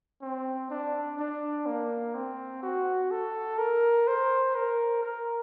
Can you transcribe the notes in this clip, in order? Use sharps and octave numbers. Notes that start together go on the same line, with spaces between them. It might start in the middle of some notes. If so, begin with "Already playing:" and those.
C4
D4
D4
A#3
C4
F#4
A4
A#4
C5
A#4
A#4